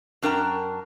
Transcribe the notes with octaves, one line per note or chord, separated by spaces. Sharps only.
F#2 D4 A#4 G5 A#5